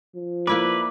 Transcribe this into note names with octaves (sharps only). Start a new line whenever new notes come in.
F3
A#3 E4 B4 D5 D6